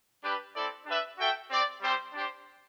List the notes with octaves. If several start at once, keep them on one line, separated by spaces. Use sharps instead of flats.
G3 D4 G4 B4
C4 E4 A4 D5
D4 G4 B4 E5
F#4 A4 E5 G5
C4 G4 D5
G3 C4 G4 C5
D4 G4 C5